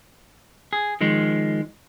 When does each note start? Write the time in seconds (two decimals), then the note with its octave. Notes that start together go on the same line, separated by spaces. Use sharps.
0.73 G#4
1.01 D#3 F3 G#3